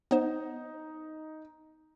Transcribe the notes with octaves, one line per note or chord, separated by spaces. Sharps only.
B3 D#4 C5